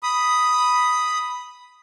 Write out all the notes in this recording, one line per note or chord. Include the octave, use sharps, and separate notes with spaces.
B5 D#6